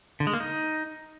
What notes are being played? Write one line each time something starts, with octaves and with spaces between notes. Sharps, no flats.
D3
G#3
A#3
D#4